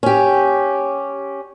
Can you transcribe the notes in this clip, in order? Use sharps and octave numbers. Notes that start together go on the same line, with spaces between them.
C#4 G4